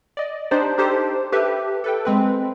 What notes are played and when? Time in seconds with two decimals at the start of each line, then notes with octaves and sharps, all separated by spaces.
0.17 D5 D#5
0.51 D4 D#4 G4 C5 D5
0.78 D4 D#4 G4 A4 C5
1.32 G4 A4 B4 E5
1.84 A4 B4 G5
2.05 G#3 C4 B4